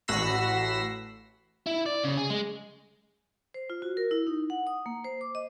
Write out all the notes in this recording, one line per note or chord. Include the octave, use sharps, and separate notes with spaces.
A1 F#4 B5 E6 A#6 C7
E4
D5
C#3
G#4
G#3
C5
F4
F#4
A#4
E4
D#4
F#5
D#6
A#3
C5
D6
D#5